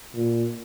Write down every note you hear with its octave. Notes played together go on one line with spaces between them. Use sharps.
A#2